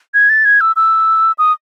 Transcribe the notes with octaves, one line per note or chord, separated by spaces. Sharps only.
G#6
A6
G#6
E6
E6
D#6